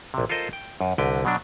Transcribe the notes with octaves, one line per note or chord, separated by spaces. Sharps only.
A#1 C3
F4 A4 A#4 C5 D#5
G5
F#2
C2 D3 B4 G5
B2 F#3 D4